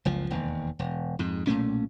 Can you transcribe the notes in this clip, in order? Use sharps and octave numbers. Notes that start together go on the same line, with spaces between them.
F#1 C#2 F3
E1 D#2
E1
F2 G#2
B1 A#2 A3 C#4